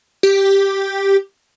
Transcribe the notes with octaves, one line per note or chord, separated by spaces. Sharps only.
G4